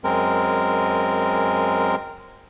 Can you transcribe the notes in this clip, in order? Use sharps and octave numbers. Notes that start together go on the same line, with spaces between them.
F#2 G#3 C4 A#4